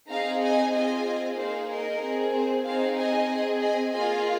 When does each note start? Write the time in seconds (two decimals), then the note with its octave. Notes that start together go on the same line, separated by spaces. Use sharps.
0.10 C4 D#4 G#4 F5 A#5
0.43 D#5 G#5
0.74 C4 F4 G#4 D#5 G#5
1.38 A#3 D#4 G#4 C5 F5
1.70 A#4 D#5
2.01 C4 G#4
2.33 C5
2.65 C4 D#4 G#4 C5 F5
2.97 D#5 G#5
3.29 C4 G#4
3.61 D#5 G#5
3.92 A#3 F4 G#4 D#5 G#5